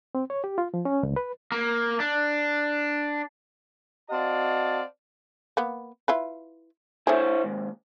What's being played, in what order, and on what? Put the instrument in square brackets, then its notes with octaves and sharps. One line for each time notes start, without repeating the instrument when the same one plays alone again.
[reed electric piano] C4
C#5
G4
F4
F3
C#4
C#2
B4
[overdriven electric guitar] A#3
D4
[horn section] C4 F#4 D5 D#5 F5 A5
[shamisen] A#3 B3
E4 F4 B4
[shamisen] A3 G#4 [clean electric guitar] E4 C5 C#5
[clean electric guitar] D#2 G#2